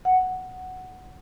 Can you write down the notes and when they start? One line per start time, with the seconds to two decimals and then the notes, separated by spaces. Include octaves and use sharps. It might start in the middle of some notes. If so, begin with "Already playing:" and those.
0.05 F#5